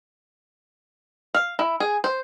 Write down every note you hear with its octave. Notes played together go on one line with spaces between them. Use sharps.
F5
E4
G#4
C5